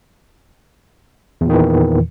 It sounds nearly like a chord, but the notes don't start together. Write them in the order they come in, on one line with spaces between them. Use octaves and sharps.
E2 A#2 D#3 E3